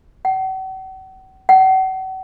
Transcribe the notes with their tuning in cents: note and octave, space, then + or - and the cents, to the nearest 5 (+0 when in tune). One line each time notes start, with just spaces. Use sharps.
F#5 +45
F#5 +40